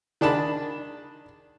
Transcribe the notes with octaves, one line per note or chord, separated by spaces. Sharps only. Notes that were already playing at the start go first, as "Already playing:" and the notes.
D#3 D4 G#4 A5 B5